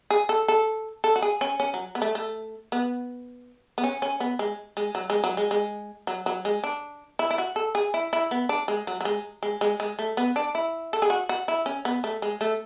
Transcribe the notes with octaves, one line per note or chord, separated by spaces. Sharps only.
G#4
A4
A4
A4
F#4
G#4
C#4
C#4
F#3
B3
A3
A3
B3
B3
C#4
C#4
B3
G#3
G#3
F#3
G#3
F#3
G#3
G#3
F#3
F#3
G#3
D4
E4
E4
F#4
A4
G#4
E4
E4
B3
D4
G#3
F#3
F#3
G#3
G#3
G#3
G#3
A3
B3
D4
E4
A4
G#4
F#4
F#4
E4
C#4
B3
A3
G#3
A3